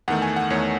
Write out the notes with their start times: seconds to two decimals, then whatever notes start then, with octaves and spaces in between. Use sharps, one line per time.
0.08 E2 D#3 A3 F#5
0.22 G#5
0.36 F#5
0.50 E2 D#3 A3 C#5